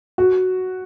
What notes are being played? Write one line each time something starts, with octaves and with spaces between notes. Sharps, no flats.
F#4